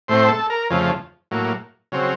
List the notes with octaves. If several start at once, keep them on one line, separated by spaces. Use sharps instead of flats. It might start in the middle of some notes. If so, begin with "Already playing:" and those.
A2 A3 C4 C5
A4
A#4
F2 C#3 F3 A3
A2 F#3 A#3
C#3 F#3 C4